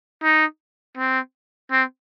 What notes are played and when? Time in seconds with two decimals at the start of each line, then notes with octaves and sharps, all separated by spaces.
0.23 D#4
0.97 C4
1.71 C4